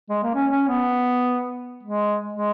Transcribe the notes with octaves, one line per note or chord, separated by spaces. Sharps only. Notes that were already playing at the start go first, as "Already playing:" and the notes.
G#3
A#3
C#4
C#4
B3
G#3
G#3